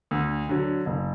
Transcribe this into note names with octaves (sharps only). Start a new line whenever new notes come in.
D2
D3 F#3
F#1